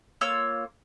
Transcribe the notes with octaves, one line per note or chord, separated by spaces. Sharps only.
A#3 F4 C#5 E6